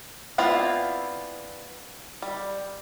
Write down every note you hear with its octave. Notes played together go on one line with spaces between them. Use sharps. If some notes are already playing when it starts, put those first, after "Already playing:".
B3 C4 D4 E4 F4
G3